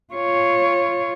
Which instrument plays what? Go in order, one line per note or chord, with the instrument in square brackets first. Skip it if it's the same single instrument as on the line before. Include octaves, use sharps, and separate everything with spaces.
[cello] F4 C#5